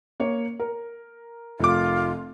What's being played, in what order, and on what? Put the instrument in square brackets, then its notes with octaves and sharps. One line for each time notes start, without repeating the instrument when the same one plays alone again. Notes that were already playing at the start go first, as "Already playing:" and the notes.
[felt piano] A#3 C#5
A#4
[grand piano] F1 D6 [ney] F4